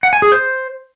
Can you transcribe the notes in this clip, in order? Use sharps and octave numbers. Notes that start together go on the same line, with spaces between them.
F#5
G#5
G#4
C5